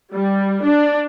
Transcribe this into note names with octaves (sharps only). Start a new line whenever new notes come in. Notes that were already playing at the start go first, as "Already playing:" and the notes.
G3
D4